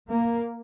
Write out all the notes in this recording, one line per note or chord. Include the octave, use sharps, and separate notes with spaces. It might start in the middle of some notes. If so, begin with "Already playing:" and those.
A#3